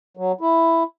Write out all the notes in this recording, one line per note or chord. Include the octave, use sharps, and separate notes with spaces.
F#3
E4